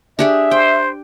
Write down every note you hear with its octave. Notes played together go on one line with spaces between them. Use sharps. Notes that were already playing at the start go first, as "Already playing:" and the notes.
D4 G4 G#4 E5
C5 G5